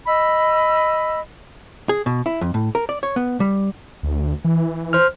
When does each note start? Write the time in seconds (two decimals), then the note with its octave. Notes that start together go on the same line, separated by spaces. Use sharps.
0.06 D#5 B5 E6
1.89 G#4
2.06 B2
2.26 E4
2.41 F2
2.54 A2
2.75 A#4
2.89 D5
3.03 C#5
3.16 B3
3.40 G3
4.03 D2
4.45 E3
4.93 C5 F6